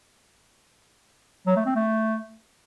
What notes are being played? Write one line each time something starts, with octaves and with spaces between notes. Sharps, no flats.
F#3
A3
C4
A3